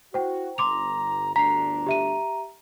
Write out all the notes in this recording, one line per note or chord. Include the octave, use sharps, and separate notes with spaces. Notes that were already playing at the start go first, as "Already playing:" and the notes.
E4 F#4 C5 G5
G1 A#5 C6 D6 F7
G1 D2 D4 A#5 B6 C7
G4 E5 D#7